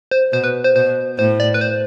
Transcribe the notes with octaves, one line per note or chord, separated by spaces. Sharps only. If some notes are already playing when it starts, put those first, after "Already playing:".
C5
B2 C5
B4
C5
B2 C5
A2 C5
D5
B4
C5